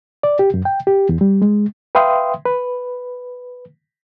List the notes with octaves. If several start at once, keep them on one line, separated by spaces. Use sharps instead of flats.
D5
G4
F#2
G5
G4
E2
G3
G#3
B4 E5 F5 G5 C6 D#6
B4